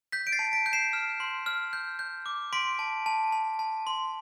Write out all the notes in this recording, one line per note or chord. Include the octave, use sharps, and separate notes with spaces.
G6 B6
D7
A6 C7
A5
B6 D7
G6
C7 E7
F6
C6
F6
G6
G6
D6
C6 B6 D7
A5
A5
A5
A5
C6